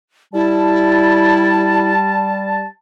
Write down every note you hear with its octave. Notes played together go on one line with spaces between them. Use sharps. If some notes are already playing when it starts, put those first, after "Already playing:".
G3 E4 A5